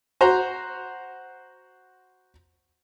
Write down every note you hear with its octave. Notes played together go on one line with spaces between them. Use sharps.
F#4 C5 A#5